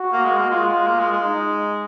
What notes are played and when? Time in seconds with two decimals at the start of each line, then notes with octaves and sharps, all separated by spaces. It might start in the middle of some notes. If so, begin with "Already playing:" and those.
Already playing: F#4
0.13 A#3
0.25 G#3
0.37 A#3
0.50 G#3 F4
0.68 G#3
0.87 A#3
1.00 G#3
1.12 G#3
1.24 D#4